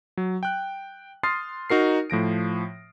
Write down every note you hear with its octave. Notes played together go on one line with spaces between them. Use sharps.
F#3
G5 F#6
C6 D#6 F6 A6 C7
D#4 F#4 A#4 C7
A2 F3 A#6 D7